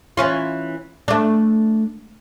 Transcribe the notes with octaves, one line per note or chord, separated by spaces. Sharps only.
E3 C#4 F4
A3 D4